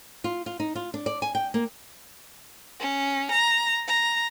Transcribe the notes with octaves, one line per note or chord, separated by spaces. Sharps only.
F4
F4
D#4
F4
D4
D5
G#5
G5
A#3
C#4
A#5
A#5